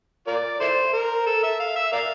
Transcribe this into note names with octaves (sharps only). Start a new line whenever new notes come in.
F4 A#4 D5
E4 A4 C5
A#4
A4
E5
F5
E5
A#4 D5 F5